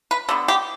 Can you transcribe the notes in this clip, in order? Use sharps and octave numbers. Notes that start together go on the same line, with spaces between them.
B4
D3 G3 B3
G4